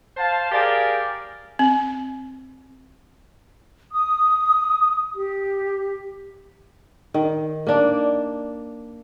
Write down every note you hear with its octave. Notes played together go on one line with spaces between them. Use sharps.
C5 F5 A5
G4 G#4 A#4 D5 F5
C4
D#6
G4
D#3
A#3 D4